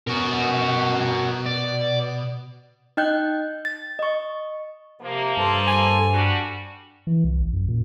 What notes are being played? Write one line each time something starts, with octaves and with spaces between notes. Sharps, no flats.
B2 F#4 A#4
D5
D#4 D#5 G5 F#6 G6
A6
D#5 C#6
C3 F3 A#3
G2 A4 C5 A5
G#5
G3 D4 F#4
E3
C2
A1
F#2
A#2